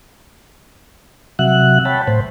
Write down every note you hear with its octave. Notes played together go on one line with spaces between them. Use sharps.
C3 F#3 E5 F#5 F#6
C#5 G5 A5 B5
A2 C5